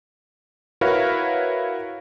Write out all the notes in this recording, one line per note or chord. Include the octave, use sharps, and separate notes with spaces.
E4 F#4 A#4 B4 C#5 F5